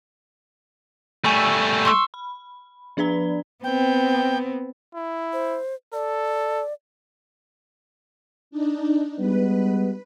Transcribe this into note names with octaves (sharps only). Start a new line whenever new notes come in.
G3 A3 G#5 C#6 E6
C6 C#6 E6
B5
F3 D4 B4 D5 A#5
B3 C4 G5
E4
C5
A4 D5
D4 D#4
G3 G#3 B3 B4